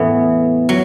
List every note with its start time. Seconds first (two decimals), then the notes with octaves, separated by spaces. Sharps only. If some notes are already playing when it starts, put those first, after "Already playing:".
Already playing: E2 A2 E3 B3
0.69 F#3